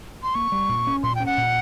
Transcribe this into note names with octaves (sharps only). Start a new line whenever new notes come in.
C6
A#3 C#6
G3
A#2
C#4
A#2 C6
C#4 G5
F#5
A#2